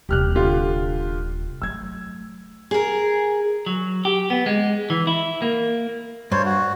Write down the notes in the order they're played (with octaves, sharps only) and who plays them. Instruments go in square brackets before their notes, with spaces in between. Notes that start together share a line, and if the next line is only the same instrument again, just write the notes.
[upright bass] D#1 C3 [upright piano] G4 F6 F#6
[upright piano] D3 F4 G4
[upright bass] F#3 A3 [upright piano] E6 G#6
[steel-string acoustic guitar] G#4 A#4
[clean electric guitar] F#3
G4
B3
G#3
E3
E4
A#3
[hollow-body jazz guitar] G2 [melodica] C5 C#5
[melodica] F#4